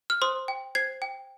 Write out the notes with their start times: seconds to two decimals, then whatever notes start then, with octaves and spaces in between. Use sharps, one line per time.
0.10 F6
0.22 C5 C6 D#6
0.48 G5
0.75 C5 G#6 C7
1.02 G5